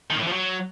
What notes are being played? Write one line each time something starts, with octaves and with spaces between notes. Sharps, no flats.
D#3
A2
E3
F3
F#3